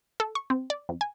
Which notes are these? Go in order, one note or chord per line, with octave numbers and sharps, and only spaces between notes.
A4
C#6
C4
D5
F2
G#5